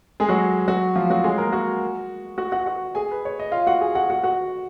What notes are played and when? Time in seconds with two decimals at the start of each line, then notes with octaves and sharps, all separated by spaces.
0.20 G#3 G#4
0.29 F#3 F#4
0.67 F#3 F#4
0.96 F3 F4
1.10 F#3 F#4
1.24 G#3 G#4
1.38 A#3 A#4
1.52 F#4 F#5
2.38 F#4 F#5
2.52 F#4 F#5
2.66 F#4 F#5
2.95 G#4 G#5
3.11 B4
3.25 C#5
3.39 D#5
3.52 F4 F5
3.67 F#4 F#5
3.81 G#4 G#5
3.95 F#4 F#5
4.10 F#4 F#5
4.24 F#4 F#5